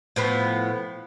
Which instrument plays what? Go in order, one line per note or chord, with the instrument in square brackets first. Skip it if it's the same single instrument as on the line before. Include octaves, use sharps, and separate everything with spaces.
[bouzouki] A2 F3 B3